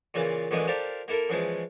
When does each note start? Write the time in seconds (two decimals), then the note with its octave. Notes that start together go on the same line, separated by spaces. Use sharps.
0.14 A#2 C#3 E3 F4
0.51 A1 F#2 D3 E3 G#3 D#6
0.67 D4 F4 G4 A4 A#4 C5
1.08 A#3 E4 A4 A#4
1.29 C#3 E3 F3 G#3